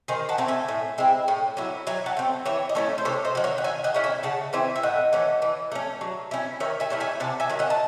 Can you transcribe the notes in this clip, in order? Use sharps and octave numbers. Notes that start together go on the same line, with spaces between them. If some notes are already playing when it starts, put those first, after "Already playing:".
D#3 G#4 C5
F#5 A5
A3 C4 E4
E5 G#5
A2
G#3 C4 E4
A2
F#3 C#4 E4
F#3 E5 G#5
F#5 A5
A3 C4
E3 C#5 E5
D#5
A3 C#4 E4 A4 C#5
C5
C3 A4 C#5
C5 D#5
D#3 F#3
C#5 E5
F#5
D#3 E5 G#5
D#5 F#5
A3 C#4 E4
E5 G#5
C#3 F#5 A5
E3 C4 E4 E5 G#5
E5
A2 D#5 F#5
E3 A3 C#4
E3
A3 C#4
F#3
C#4 E4
D#3 C#5 E5
E5 G#5
A3 C#4 E4
E5 G#5
C3 F#5 A5
E5 G#5
D#3 F#3
D#5 F#5
A5